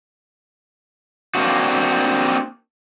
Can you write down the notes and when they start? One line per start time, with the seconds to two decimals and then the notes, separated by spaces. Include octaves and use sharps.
1.35 A#3 C4 D4 F#4